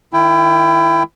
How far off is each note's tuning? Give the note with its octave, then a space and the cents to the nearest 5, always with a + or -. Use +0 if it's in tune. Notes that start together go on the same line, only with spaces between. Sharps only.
D#3 +0 E4 +25 G5 +15